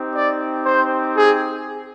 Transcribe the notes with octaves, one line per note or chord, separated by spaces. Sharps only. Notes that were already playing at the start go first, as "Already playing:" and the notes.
Already playing: C4 D#4 G4
D5
C5
G#4